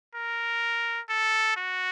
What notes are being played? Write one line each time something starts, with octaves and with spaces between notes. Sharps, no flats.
A#4
A4
F#4